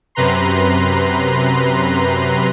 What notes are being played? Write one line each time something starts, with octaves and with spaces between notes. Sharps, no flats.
F#2 C3 B4 A#5 C6